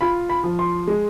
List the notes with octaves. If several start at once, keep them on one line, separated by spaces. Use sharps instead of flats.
F4 B5
B5
F3
C6
G#3